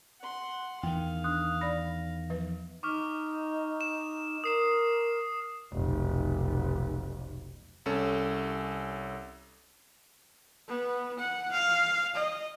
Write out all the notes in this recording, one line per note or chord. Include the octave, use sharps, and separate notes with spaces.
F#5 C6
E2 D#3 F5 G5
D4 D#6 F#6
D5 B5 A#6
F3 B4
D#4 C#6 D6 F6
E7
A#4 D#6 C7 E7
F1 B1
C2 C#4 A4
B3
F#5
F5
D#5